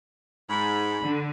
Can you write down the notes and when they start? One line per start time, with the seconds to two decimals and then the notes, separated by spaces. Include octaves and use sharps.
0.50 G#2 B5
1.02 D3